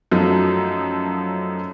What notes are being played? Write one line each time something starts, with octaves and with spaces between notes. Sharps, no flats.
F#2 F3 F#3 A3 D#4